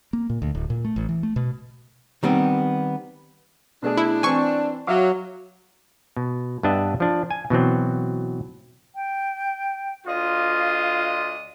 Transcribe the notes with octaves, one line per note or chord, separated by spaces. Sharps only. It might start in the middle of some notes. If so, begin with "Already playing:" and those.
A#3
A#2
D2
D1
A#2
A3
A1
E3
A3
B2
D#3 G3 B3 C4
B2 A3 D4 G#4
E4
E3 C4 G#5 C#6
F#3 E5 F5 D6
B2
G2 B3 D4 D#5 E5
F3 D4
G#5
B2 E3 F#3 C4
G5
D2 D4 F4 D#5 F5